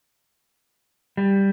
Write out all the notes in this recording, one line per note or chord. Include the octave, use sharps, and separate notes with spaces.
G3